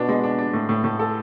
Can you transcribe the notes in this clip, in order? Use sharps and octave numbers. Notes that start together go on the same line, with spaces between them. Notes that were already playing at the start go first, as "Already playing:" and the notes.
Already playing: B2 B3 D4
G#3
D4
D4
A2
A2
A2
A4